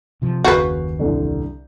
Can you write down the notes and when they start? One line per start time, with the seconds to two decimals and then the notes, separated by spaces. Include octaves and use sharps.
0.22 C3 F3
0.44 F#1 D#2 C#3 F#4 B4 F5 G6 C7
0.99 C2 D3